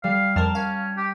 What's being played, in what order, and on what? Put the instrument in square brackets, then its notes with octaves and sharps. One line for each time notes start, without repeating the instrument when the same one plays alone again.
[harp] G3 [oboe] F5
[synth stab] F2 A#4 [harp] A5 F6
[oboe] C#4 [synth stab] F5
[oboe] G4